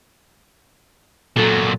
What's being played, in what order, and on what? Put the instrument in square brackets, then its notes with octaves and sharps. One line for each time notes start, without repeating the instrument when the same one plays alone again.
[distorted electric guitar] A#2 F#3 [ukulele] A4